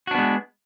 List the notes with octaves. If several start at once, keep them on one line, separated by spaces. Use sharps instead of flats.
G#3 B3 D4 F#4